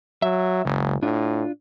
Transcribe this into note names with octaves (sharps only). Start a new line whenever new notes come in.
F#3 E5
F#1 C#2
A2 D4 F4